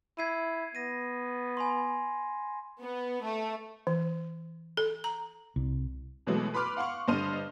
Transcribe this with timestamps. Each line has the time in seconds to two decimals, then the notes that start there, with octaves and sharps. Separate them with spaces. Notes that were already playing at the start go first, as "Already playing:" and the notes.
0.19 E4 G#6 C7 D#7
0.75 B3 A#6 D#7
1.57 G#5 B5 C6
2.80 B3
3.23 A3
3.87 E3
4.77 A4
5.04 A#5
5.56 C2
6.27 B2 E3 F#3 G#3 A3 B3
6.54 B4 B5 C6 D6 F6
6.77 F5 F#5 C6 C#6
7.08 G2 D3 C5 D#5 F6 D#7